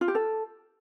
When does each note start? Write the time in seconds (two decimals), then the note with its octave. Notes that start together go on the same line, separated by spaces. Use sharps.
0.01 F4
0.08 G4
0.15 A4